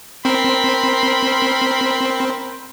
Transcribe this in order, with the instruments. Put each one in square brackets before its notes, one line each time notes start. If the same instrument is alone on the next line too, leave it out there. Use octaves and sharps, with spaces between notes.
[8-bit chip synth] C4 [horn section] A#4 B5 C6